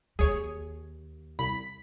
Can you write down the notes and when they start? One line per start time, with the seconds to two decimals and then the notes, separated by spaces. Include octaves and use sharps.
0.19 D#2 G#4 C#5
1.39 C2 B5 B6